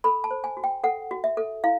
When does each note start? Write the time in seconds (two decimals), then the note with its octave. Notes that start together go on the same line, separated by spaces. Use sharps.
0.04 A4 B5
0.24 A5
0.31 C5
0.44 G#5
0.57 F#4
0.64 G5
0.84 A4 F#5
1.11 F#4
1.24 E5
1.37 A4
1.64 E4 F5